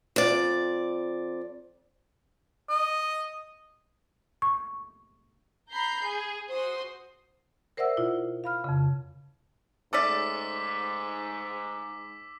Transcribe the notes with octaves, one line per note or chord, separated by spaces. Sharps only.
F2 D5
D#5
C#6
A#5 B5 G6 C7
G#4
F#4 C5 C6 D#6
A#4 C5 D5 E5 F#5 E6
B2 E4 F4
F5 B5 F6
F2 C#3
G#2 A3 C#4 D5 D6 E6 B6